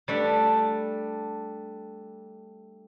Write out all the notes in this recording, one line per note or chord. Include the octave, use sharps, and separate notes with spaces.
G3 A3 D4